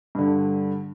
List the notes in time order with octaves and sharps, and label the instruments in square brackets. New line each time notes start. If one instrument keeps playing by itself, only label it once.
[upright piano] G2 D3